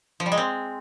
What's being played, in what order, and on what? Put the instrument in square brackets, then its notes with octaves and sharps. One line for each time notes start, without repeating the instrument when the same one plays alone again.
[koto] F3
G3
G#3
C4